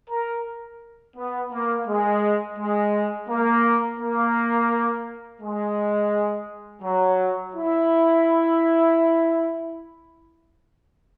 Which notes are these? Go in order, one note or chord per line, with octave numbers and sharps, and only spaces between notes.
A#4
B3
A#3
G#3
G#3
A#3
A#3
G#3
F#3
E4